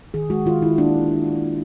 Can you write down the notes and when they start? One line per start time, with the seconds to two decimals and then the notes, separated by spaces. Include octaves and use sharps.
0.14 D#3 G#4
0.30 G#3 F#4
0.45 D#3 F4
0.62 D#3 E4
0.78 A#3 D4